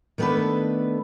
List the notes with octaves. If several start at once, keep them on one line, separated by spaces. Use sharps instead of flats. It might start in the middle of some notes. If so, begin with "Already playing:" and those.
D#3 A3 B3 D4 A4 B4